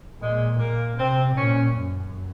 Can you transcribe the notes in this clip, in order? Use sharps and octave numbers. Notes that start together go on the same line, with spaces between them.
A#2 G#3
A#2 A#3
C3 C4
A#2 C#4
F#2